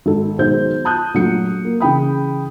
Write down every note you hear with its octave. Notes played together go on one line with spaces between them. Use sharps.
G#1 A4
B1 D#3 G#3 C5 G6
A5 D#6 F#6 G6
A#1 F#3 A3 F#4 C#7
A#3
C#3 E3 G5 B5 D#6